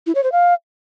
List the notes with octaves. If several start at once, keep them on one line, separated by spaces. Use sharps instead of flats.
E4
C#5
C5
F5